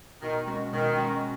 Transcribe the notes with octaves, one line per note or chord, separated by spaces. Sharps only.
B2 D#3
G#3 C#4 F#4
B2 D#3
G#3 C#4 F#4